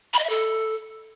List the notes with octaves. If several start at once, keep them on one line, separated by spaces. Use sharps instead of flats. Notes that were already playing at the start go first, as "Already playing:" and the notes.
B5
D#5
E5
A4